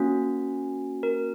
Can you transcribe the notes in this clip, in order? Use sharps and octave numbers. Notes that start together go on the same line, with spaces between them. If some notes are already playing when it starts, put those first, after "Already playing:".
Already playing: A#3 C#4 F#4
A#4